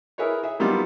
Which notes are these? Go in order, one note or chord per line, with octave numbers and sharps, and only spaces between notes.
E4 G#4 A#4 B4 C#5
G#4 E5
D#3 F#3 G3 B3 F4 D6